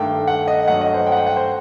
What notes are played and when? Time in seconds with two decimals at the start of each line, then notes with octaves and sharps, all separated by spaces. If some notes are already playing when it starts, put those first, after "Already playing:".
Already playing: G2 D#3 A3 G5
0.28 F#5
0.48 D#5
0.68 G2 F#3 A3 F#5
0.81 D#5
0.94 C5
1.07 G5
1.12 F#5
1.17 G5
1.27 F#5
1.37 C5